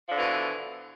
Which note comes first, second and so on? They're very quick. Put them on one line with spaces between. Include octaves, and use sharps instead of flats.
F3 D3 E3 B2